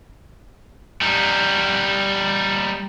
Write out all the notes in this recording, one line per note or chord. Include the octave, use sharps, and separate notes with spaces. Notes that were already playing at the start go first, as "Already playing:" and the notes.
G3 D#4